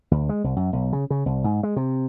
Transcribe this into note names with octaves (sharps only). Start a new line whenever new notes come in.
D2
G#3
C2
F#2
B1
C#3
C#3
C2
G#2
G#3
C3